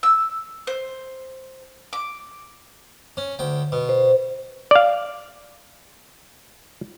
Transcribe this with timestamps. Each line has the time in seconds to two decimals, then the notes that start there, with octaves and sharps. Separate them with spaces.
0.03 E6
0.67 C5
1.93 D6
3.17 C#4
3.39 D2 G5
3.72 B2
3.89 C5
4.71 D5 F5